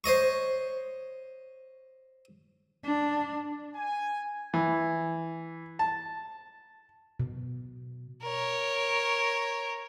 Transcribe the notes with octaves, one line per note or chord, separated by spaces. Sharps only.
C5 C#5 D#5 C#6
D4
G#5
E3
A5
B2
A#4 C#5